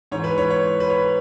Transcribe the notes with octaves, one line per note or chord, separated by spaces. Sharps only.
G#2 E3 C#5
B4
C#5
C#5
B4
C#5